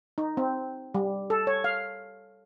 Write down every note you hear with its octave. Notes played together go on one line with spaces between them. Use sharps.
D#4
C4
G3
A4
C#5
F5